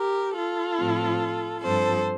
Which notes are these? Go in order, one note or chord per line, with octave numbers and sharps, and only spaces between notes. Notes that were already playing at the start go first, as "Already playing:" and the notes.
Already playing: G4 A#4
F4 A4
A2 F3 C4
G2 F3 C4 A4 C5